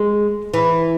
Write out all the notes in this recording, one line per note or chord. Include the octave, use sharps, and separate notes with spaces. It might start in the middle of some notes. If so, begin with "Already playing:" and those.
Already playing: G#3
E3